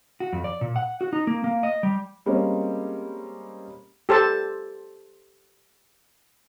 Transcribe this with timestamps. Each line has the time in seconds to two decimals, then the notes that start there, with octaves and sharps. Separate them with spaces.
0.20 F#4
0.33 F2
0.44 D5
0.61 A#2
0.76 F#5
1.01 F#4
1.13 D#4
1.27 A#3
1.44 A#3
1.63 D#5
1.83 G3
2.26 G3 G#3 A#3 C4 C#4
4.09 G4 A4 C5 A5